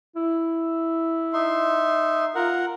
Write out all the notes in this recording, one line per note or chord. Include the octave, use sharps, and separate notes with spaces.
E4
D#4 E5 C6
F4 A#4 F#5